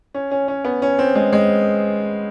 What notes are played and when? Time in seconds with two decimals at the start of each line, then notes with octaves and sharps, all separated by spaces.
0.14 C#4
0.31 C#4
0.48 C#4
0.65 B3
0.82 C#4
0.99 C4
1.15 G#3
1.33 G#3